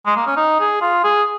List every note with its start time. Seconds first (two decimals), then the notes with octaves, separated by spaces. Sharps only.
0.06 G#3
0.16 A#3
0.27 C#4
0.37 D#4
0.60 G#4
0.81 F4
1.04 G#4